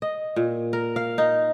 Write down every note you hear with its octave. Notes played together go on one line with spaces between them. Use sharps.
D#5
A#2
A#4
F5
D#4